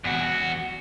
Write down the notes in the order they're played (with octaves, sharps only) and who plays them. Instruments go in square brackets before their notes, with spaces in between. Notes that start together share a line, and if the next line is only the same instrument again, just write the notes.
[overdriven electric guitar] E2 F#4